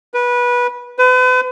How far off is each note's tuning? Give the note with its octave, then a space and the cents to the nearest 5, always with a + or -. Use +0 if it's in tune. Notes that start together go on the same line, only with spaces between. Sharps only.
B4 -20
B4 +40